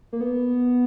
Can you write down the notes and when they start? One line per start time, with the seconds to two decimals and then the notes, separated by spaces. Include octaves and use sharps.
0.13 A#3
0.21 B3